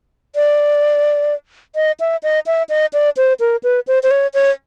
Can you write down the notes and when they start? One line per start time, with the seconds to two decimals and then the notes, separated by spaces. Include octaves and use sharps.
0.36 D5
1.75 D#5
2.00 E5
2.23 D#5
2.46 E5
2.69 D#5
2.93 D5
3.17 C5
3.40 A#4
3.63 B4
3.87 C5
4.03 C5
4.11 C#5
4.34 C#5